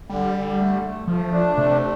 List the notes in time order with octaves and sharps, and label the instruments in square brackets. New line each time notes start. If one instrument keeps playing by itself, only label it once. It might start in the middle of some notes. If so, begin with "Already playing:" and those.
[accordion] D3 [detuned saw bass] G3
[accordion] D3
A3
A3
[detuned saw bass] F3 [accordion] A3
[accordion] D4
[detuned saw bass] C3 [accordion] A3